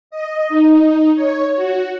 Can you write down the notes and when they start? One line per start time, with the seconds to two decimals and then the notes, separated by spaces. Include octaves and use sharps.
0.11 D#5
0.49 D#4
1.15 C#5
1.56 F#4